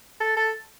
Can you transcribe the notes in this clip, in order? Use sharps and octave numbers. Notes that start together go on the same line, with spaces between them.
A4
A4